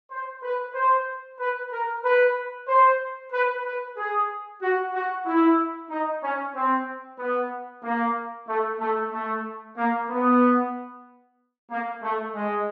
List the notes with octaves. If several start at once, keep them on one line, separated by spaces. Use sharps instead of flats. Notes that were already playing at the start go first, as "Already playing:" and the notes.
C5
B4
C5
B4
A#4
B4
C5
B4
B4
G#4
F#4
F#4
E4
D#4
C#4
C4
B3
A#3
A3
A3
A3
A#3
B3
A#3
A3
G#3